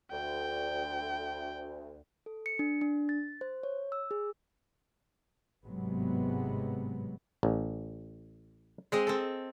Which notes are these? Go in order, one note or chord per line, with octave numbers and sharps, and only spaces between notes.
D2 G5
A4
C#7
D4
D4
A6
C5
C#5
E6
G#4
G#1 A2 C3 F#3 G#3 B3
A1
G#3 C4 D#5
C4 A4